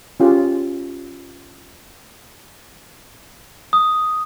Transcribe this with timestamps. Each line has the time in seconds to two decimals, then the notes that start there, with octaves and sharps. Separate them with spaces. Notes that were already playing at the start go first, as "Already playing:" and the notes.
0.20 C#4 F4 G4 G#4
3.73 D#6